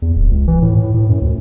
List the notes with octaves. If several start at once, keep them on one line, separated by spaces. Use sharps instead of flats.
E2
D1
C#2
E3
A2
A2
A2
F#2
D2